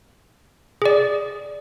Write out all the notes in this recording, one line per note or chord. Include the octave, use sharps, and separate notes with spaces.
G#4 D5